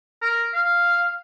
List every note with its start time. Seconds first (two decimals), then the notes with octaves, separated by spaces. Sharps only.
0.22 A#4
0.54 F5